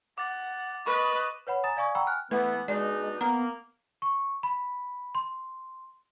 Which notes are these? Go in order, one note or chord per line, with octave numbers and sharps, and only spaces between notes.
F#5 D6 A6
B4 D#5 B5 C#6
B4 C#5 F#5 B5
G#5 A#5 D#6 A6 E7
D5 F5 G#5 C#6 D#6 G#6
F#5 G5 A#5 B5 C#6 E6
G#5 F6 F#6
E3 A3 B3 B4 F#5
B2 G#3 D4 D#4 D5
A#3 B3 A#5
C#6
B5
C6